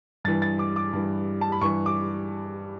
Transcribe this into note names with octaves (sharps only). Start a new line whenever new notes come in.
G2 E3 A6
A6
D6
D6
G2 E3
A5
B5
G2 E3 C#6
D6